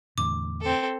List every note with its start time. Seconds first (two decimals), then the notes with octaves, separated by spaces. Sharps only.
0.18 E2 A2 D3 D6
0.62 C4 A4